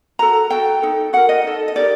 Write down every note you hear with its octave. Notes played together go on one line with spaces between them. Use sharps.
F#4 A4 A#5
F#4 A4 G5
D#4 A4
F#4 A#4 F#5
D#5
D#4 A4
D#5
D#4 G4 A#4 D5